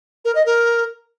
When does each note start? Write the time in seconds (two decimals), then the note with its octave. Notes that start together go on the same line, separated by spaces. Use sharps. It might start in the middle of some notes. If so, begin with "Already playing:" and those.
0.25 A#4
0.35 D#5
0.46 A#4